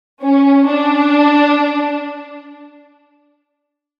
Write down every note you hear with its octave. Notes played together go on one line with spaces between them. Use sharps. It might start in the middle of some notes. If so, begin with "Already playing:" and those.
C#4
D4